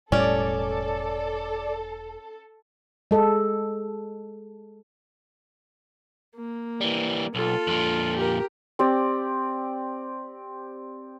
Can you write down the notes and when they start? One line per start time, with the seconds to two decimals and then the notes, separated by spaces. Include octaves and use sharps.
0.12 E1 A2 G3 C#4 A4 D5
3.11 G#3 A4 D#5
6.35 A#3
6.81 E3 G3
7.35 B1 F4 A4
7.67 F2 A#2
8.16 G4 A#4
8.79 C4 G4 D5